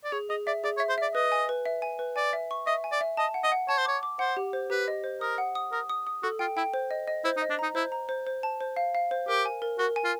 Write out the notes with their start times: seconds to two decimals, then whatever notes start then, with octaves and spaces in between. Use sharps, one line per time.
0.04 D5
0.12 G#4 C#5
0.30 G#4 D#5
0.47 D5 E5
0.64 G#4 D5
0.77 C#5
0.80 E5
0.89 C5
0.98 D5 E5
1.15 B4 D#5
1.32 G#5
1.49 B4
1.66 E5
1.82 G#5
1.99 B4
2.16 D5 G#5
2.33 E5
2.51 C#6
2.67 D#5 E5
2.84 G#5
2.92 D5
3.01 E5
3.17 D#5 A5
3.34 F#5
3.43 D#5
3.52 F#5
3.68 C#5 A5
3.78 C5
3.85 C#5 D6
4.03 D6
4.19 C5 F#5
4.37 G4
4.53 C5
4.70 G4 B4
4.88 D#5
5.04 C5
5.21 A#4 D#6
5.38 F#5
5.55 D#6
5.72 A#4 D#6
5.89 D#6
6.07 D#6
6.23 F#4 A4
6.39 F4 G5
6.57 E4 G5
6.74 C5
6.91 D#5
7.08 D#5
7.24 E4 C5
7.37 D#4
7.42 D#5
7.50 D4
7.59 D#4 A#5
7.75 E4 C5
7.92 A#5
8.09 C5
8.27 C5
8.43 A5
8.61 C5
8.76 F5
8.95 F5
9.11 C5
9.28 G4 A#4
9.45 G#5
9.62 A#4
9.78 F#4 A#4
9.96 G#5
10.04 F4